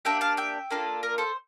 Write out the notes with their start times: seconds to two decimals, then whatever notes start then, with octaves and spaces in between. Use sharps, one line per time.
0.05 A#3 D4 G4 E5 G5
0.21 F5 A5
0.37 E5 G5
0.71 A#3 D4 F4 A4
1.03 A#4
1.18 A4 C5